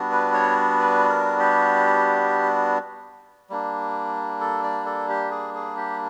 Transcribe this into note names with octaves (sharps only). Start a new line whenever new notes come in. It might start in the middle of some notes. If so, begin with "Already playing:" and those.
Already playing: G3 B3 D4 F#4
B4
C#5
B4
A#4
G4
G3 A#3 D4
A4
D5
A4
G4
G#4
G#4
G4